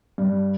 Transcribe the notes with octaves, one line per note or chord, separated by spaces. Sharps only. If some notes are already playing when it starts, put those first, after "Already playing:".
G2